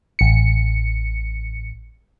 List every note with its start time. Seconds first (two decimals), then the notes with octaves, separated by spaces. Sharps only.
0.19 A1 C#7